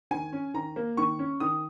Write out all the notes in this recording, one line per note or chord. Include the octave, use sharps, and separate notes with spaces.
D#3 G#5
C#4
D#3 A#5
A#3
D#3 C#6
C#4
D#3 D#6